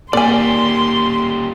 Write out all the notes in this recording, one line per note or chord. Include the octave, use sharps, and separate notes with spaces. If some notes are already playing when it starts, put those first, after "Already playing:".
A#2 G3 A#3 D5 G#5 C6